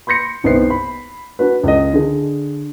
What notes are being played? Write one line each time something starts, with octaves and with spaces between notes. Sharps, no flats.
B5 C6 G6 A#6 C#7
G1 C2 B3 D#4 C5 C7
B5
D4 F#4 B4
C#2 A4 D#5
D3 D4 G#4